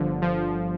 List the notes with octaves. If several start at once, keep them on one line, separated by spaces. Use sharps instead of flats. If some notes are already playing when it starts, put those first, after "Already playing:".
Already playing: G1 D3 F3
F3